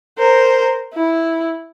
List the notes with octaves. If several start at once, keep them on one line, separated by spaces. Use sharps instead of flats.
A#4 C5
E4